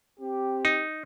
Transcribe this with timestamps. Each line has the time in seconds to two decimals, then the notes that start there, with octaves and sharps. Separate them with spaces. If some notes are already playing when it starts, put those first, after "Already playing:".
0.20 C4 G4
0.65 D#4